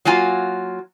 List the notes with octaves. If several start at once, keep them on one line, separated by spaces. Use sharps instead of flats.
F#3 A#3 F4 G#5